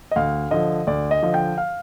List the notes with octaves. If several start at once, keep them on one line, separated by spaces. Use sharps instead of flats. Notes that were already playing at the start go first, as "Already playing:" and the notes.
D#5
D2 F5
D3 F3 D#5
D2 D5
D#5
D3 F3
G5
F5